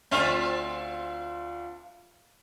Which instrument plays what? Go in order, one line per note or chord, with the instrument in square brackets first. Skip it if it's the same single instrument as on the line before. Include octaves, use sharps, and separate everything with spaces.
[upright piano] D2 D4 F6 [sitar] C4 F4 E5